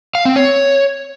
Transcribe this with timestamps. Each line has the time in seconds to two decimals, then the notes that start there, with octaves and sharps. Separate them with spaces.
0.15 F5
0.25 C4
0.36 C#5